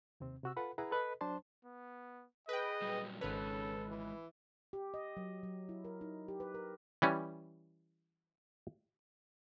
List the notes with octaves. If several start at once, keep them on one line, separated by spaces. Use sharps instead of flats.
D#2 C3 C4
C3 F#4 E6
F4 A4 B4 F#5 B5
E4 G#4 B4 F#5 A#5 B5
A4 B4 D#5
F#3 D4 C5 A5 C6
B3
G#4 B4 D#5 G5
A#2 F#3 G3
G#1 G#3 C#4 A4 B4 C#5
E3
G4
D#5
F#3
F#3
E4
A#4
D#4
G4
B4
A#4
E3 G3 C#4